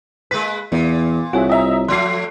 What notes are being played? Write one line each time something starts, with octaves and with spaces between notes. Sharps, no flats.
G#3 A#3 B4 B6
E2 A#2
C2 F4 F#4 G#4 C#5 E5
D#5 E5 A#5
F3 A3 C6 F#6 C7